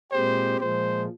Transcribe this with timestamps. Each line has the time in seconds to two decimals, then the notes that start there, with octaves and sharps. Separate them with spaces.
0.11 A#2 G#3 C4 G4 C5
0.60 A#2 F3 G#3 C5